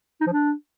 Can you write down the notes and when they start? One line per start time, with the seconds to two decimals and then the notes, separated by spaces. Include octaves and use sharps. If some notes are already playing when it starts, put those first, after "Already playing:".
0.21 D#4
0.27 F3
0.33 D4